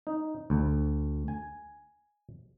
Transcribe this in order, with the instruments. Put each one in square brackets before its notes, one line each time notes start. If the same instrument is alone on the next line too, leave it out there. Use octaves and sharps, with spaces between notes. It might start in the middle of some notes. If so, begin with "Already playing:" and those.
[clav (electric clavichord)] D#4
D2
G#5